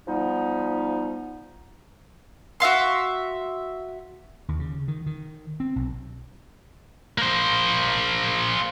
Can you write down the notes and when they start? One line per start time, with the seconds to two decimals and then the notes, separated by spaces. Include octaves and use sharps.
0.08 F3 G3 B3 D#4
2.60 F#4 E5 F5 C6
4.48 D#2
4.60 C#3
4.88 D#3
5.06 D#3
5.60 C4
5.76 B1
7.18 A#3 C5